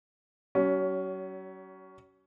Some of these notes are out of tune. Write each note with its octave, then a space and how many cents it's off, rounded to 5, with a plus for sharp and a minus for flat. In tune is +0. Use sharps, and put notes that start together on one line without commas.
F#3 +40 C#4 +20